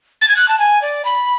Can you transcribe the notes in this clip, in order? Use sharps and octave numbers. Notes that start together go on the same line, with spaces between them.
A6
G#6
F#6
A5
G#5
D5
B5